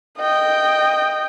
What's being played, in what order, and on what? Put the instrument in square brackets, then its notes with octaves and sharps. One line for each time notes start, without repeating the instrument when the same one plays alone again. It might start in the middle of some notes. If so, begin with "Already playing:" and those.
[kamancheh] D#5 G5